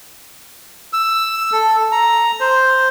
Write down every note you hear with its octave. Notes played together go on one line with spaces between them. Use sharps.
E6
A4
A#5
C5